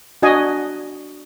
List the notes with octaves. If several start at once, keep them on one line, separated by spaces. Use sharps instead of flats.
D4 F#4 D#5 G#5